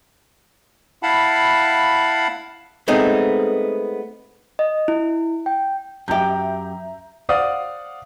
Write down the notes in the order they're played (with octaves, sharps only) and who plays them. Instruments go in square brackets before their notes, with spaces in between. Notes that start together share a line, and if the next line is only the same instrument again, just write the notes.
[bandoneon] E4 F5 F#5 A5 B5
[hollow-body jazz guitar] G#3 A3 B3 C4 D#4
[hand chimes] D#5
E4
G5
[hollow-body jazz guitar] F#2 G4 [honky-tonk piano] E5 A#5 G6
[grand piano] C5 D5 F5 F#5 D#6